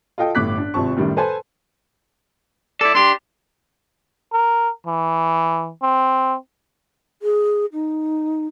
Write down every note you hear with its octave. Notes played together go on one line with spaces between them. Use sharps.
F4 A4 D#5 G5
G1 A2 D6 F#6 B6
D4
G#1 C3 F3 A5 C#6
F#2 A2 D#3 G3
A4 B4 C5 G#5 A5
E4 A4 D5
D4 G4 C6
A#4
E3
C4
G#4
D#4